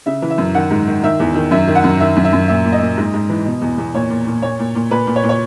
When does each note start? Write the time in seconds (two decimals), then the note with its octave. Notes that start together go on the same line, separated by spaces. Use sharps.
0.06 C#3 E5
0.22 E3
0.30 E5
0.38 F#2
0.55 D#3 F#5
0.71 G#2
0.87 D#3
1.03 D#3 E5
1.20 E2
1.35 D#3
1.51 F#2 E5
1.67 D#3
1.75 F#5
1.84 F#2
2.00 D#3 E5
2.16 F#2
2.24 E5
2.33 F#2
2.48 A#2 E5
2.65 A#2
2.72 D#5
2.81 A#2
2.97 G#2
3.14 G#2
3.29 E3
3.46 B2
3.61 E2
3.78 E2
3.94 A#2 C#5
4.10 A#2
4.27 A#2
4.42 A#2 C#5
4.59 A#2
4.75 A#2
4.91 A#2 B4
5.07 A#2
5.16 C#5
5.24 A#2
5.29 C#5